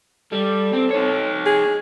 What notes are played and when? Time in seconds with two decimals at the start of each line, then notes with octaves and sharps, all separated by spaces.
0.32 G3 A4
0.73 C4
0.91 D#4 C#5
1.46 G#4